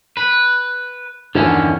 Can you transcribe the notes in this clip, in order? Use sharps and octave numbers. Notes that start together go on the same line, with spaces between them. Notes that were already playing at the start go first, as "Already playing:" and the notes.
B4
E2 G2 D3 D#3 C#4